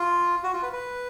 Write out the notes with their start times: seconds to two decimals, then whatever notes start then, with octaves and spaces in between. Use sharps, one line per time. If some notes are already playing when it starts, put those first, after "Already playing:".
Already playing: F4
0.43 F#4
0.53 F4
0.63 B4
0.73 B4